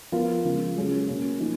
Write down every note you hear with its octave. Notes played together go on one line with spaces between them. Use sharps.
F3 B3 F4 A#4
C#3 F3 G#3
F#3 C#4 G#4
B2 A#3 C#4
F3 A#3 D#4